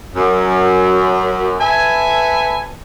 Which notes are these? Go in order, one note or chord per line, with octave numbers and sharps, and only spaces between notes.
F#2
A4 B4 E5 G#5